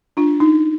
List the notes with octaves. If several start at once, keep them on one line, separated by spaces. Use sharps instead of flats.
D4 F4
D#4